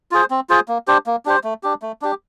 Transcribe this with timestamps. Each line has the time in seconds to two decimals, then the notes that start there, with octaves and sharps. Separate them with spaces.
0.11 F4 G#4 C5
0.30 C4
0.49 F4 G#4 C5
0.68 A#3
0.87 D4 G4 C5
1.06 A#3
1.25 D4 G4 C5
1.44 A3
1.63 D4 G4
1.82 A3
2.02 D4 G4